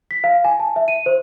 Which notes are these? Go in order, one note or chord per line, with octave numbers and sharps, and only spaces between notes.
B6
F5
G#5
A5
E5
D#7
C5